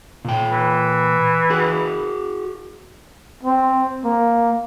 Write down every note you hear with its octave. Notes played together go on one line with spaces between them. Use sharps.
A#2 G5
E3
F#4 G#4
C4
A#3